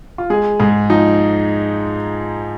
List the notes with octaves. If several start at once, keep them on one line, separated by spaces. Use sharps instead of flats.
F4
G#3 G#4
G#2 G#4
F3 D#4